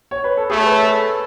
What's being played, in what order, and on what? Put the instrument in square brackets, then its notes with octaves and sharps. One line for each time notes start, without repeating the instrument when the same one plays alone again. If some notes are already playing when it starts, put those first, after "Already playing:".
[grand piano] C#5
B4
A4
[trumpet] A3 [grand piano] G#4
[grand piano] C#5
B4
A4